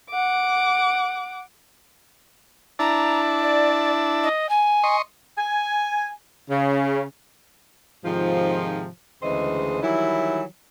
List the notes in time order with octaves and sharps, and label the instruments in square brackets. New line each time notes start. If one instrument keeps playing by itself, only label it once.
[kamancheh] F#5 D6
[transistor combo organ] D4 E4 A5 [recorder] A#5
[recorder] D5
D#5
G#5
[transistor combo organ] D#5 C6 C#6
[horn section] G#5
C#3
[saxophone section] G#2 C3 D#3 F3
D2 C#3 E3 G#3 C5 D#5
D#3 E3 F#3 G3 E4